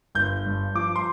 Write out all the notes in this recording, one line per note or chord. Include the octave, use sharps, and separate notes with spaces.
G1 G6
G2
F3 D6
C6